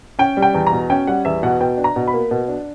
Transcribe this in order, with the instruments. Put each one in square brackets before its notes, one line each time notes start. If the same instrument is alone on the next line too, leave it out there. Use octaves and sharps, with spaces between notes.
[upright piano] C#4 G5
G3
G5
E2
A#5
B2
C#4 G5
G3 F#5
E2 E5
B2 F#5
B2 G5
D4
A#5
B2
B5
A#3
B2
D4